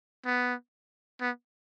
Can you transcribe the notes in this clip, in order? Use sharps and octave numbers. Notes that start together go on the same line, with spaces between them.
B3
B3